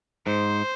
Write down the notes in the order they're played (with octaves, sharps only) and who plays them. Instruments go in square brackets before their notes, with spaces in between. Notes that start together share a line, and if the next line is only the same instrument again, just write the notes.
[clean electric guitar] G#2 [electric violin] C5